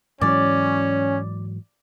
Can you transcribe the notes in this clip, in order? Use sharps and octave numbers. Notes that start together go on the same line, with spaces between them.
G#2 E3 F#3 C#4 D5